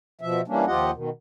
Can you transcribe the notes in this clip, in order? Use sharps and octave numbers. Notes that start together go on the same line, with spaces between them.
B2 F3 E5
E3 G3 A#3 C#4 D4
D#2 F3 F4 G4 D#5 F#5
B2 D#3